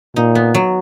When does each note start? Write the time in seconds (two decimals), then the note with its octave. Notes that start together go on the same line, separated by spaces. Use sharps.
0.16 A#2 D#4
0.35 B3
0.54 F#3